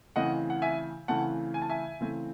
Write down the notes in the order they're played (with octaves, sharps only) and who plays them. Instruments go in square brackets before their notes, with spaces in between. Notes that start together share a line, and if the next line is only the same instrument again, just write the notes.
[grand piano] C#3 E3 A3 C4 D#5 F#5
F#5
E5 G#5
C#3 E3 A3 C4 F#5 A5
G#5
A5
E5 G#5
C#3 E3 A3 C4